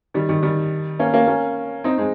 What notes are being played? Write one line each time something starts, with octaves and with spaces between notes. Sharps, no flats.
D#3 G3
D#3 G3
D#3 G3
A#3 C#4
A#3 C#4
A#3 C#4
C4 D#4
G#3 C4